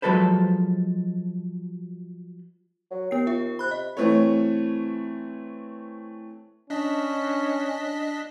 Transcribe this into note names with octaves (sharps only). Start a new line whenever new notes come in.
F3 F#3 G#3 A4 B4 C5
F#3
D#2 B3 C7
F4 E5
C3 B5 F#6
D#5
E3 A3 C4 B4 C#5
C#4 D4 D#5 B6